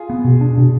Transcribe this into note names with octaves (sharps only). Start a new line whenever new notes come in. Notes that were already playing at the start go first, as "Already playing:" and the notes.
Already playing: F4 G#4
B3
B2
D4
B2